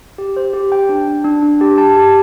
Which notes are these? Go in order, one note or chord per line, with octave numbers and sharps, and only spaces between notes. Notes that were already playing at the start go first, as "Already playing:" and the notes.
G4
C5
G4
G5
D4
D4
D4
D4
G4
A5
G4